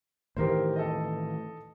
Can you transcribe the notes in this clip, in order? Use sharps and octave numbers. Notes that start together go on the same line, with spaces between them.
A2 D#3 E3 G4 A#4 C5
A4 D#5